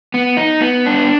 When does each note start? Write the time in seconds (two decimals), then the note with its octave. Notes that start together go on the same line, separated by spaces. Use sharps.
0.14 B3
0.37 D#4
0.61 B3
0.86 D4